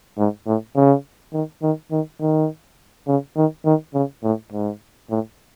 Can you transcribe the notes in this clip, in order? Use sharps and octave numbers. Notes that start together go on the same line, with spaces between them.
G#2
A2
C#3
D#3
D#3
D#3
D#3
C#3
D#3
D#3
C#3
A2
G#2
A2